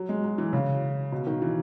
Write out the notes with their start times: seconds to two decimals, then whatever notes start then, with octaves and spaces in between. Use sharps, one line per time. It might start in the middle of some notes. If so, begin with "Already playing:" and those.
Already playing: F#3
0.09 G#3
0.24 F#3
0.38 E3
0.53 C#3
1.12 B2
1.27 D#3
1.42 E3